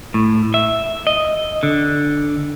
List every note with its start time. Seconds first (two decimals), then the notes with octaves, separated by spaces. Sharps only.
0.14 A2
0.54 E5
1.07 D#5
1.63 D3